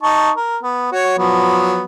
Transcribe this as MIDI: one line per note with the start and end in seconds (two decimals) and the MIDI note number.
0.03 0.31 63
0.03 0.31 81
0.03 0.31 85
0.37 0.57 70
0.63 0.91 59
0.92 1.17 66
0.92 1.17 73
1.18 1.85 53
1.18 1.85 54
1.18 1.85 59